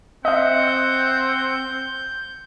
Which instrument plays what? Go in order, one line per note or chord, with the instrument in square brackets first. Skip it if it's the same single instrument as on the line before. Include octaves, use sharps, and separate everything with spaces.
[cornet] C4 [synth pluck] D#5 E5 [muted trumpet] F#5 [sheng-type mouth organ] G6